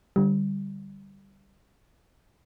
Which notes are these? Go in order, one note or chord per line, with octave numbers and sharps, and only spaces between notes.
D3 G3